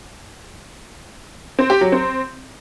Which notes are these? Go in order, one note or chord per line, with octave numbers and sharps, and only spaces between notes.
C4
G4
F#3
C4